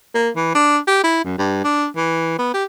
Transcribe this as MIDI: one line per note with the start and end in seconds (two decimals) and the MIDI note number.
0.15 0.29 58
0.36 0.51 52
0.55 0.78 62
0.87 1.01 67
1.04 1.24 64
1.24 1.33 42
1.38 1.62 43
1.64 1.87 62
1.96 2.38 52
2.39 2.50 59
2.54 2.64 67